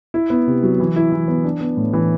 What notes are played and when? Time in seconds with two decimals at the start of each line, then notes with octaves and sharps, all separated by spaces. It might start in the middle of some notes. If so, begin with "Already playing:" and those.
0.14 E4
0.30 B3
0.47 C3
0.63 F#3
0.80 E3
0.96 E4
1.12 E3
1.28 B3
1.44 D4
1.61 B3
1.77 A2
1.93 E3